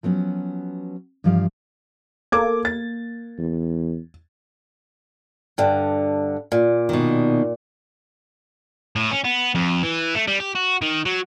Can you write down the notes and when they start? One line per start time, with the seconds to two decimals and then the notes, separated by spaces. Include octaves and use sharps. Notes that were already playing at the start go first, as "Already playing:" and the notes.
0.03 F3 F#3 B3 C#4
1.24 G2 E3 F3 G4 F5
2.32 A#3 A4 D6 G#6
2.65 A6
3.38 E2
5.58 G2 D3
6.52 A#2
6.89 B2 D#3
8.96 A2
9.11 C#4
9.24 B3
9.55 F2
9.83 E3
10.15 A3
10.28 G3
10.40 G4
10.55 F#4
10.82 D#3
11.06 F#3